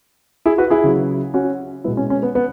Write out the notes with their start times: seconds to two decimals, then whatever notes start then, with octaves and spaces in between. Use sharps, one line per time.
0.46 E4 G#4
0.58 F#4 B4
0.70 E4 G#4
0.84 C#3 F#3
1.34 C#4 F#4
1.84 G#3 B3 E4
1.88 B2
1.97 C#4
2.10 C#4
2.23 B3
2.35 B3